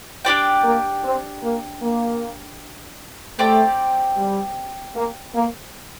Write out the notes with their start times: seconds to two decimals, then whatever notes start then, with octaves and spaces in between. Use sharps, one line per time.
0.25 D4 G4 D5 G5
0.64 A#3
1.04 C4
1.43 A#3
1.83 A#3
3.39 A3 C4 G4 D5 G5
4.17 G3
4.96 A#3
5.35 A#3